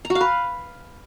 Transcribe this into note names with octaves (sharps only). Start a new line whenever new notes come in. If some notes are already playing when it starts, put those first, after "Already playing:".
A#5
F#4
F5
B4